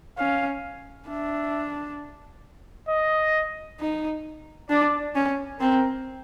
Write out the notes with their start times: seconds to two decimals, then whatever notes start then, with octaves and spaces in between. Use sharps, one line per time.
0.18 C#4 F5
1.09 D4 E5
2.89 D#5
3.80 D#4
4.70 D4 D5
5.15 C#4
5.60 C4 A#4